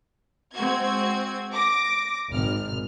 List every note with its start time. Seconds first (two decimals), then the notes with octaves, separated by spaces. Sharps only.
0.54 G#3 C4 F#4 G#6
1.51 D6 A#6
2.31 G#1 F6